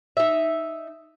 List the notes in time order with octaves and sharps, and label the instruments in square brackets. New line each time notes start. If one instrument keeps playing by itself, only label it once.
[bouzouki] D#4 E5